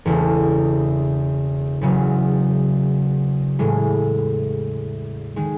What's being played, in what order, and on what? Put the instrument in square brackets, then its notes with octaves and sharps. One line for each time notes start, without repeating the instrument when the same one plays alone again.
[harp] E1 E2 C#3 E3 A3
E2 C#3 F#3
A2 E3 G#3
D#3 G#3